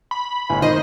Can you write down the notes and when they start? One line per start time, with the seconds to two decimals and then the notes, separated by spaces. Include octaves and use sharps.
0.11 B5
0.49 G1 A2 G#5
0.62 D#3 D#4 C5 D#5